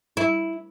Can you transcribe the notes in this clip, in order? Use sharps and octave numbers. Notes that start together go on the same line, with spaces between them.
E4